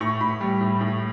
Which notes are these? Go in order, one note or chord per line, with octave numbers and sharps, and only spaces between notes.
A2 C#6
A2 B5
G3
A2
A2